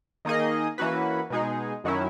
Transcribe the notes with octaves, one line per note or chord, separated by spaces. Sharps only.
D#3 A#3 D#4 G#4 D#5
E3 A#3 C#4 F#4 B4
B2 G#3 D#4 G#4
F#2 D#3 F#3 C#4 E4